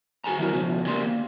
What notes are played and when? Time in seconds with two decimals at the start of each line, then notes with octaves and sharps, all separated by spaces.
0.24 F#4 G#4 G#5 A#5
0.38 D#3 F#3 E4 F#4 A#4
0.52 C#2 B2 F3
0.86 C#3 G3 A#3 C6
1.06 A#3